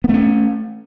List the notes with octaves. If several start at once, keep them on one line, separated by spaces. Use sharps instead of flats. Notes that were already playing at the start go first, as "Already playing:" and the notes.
A3 B3 C#4